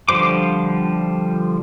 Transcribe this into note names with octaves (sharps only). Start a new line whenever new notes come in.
D3 F3 G3 C5 D6